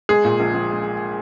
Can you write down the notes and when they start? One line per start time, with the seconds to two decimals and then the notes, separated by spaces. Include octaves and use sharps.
0.09 G#3 G#4
0.25 A#2
0.40 A#1
0.54 A#1
0.70 G#3